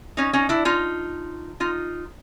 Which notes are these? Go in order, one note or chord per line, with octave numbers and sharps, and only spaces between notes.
C#4 D#4
C#4 D#4
D4 E4
D#4 F4
D#4 F4